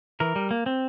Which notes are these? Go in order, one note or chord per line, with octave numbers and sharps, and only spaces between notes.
E3 A#4
G3
A#3
C4